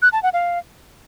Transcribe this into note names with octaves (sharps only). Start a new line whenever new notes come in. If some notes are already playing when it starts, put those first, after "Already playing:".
F#6
A5
F#5
F5